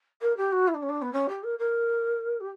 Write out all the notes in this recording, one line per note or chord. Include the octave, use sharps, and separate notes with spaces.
A#4
G4
F#4
E4
D4
C#4
D4
B3
C#4
G4
A#4
A#4
G4